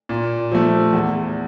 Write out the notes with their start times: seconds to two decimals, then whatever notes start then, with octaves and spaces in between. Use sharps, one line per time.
0.09 A#2
0.52 F3 A3
0.93 E2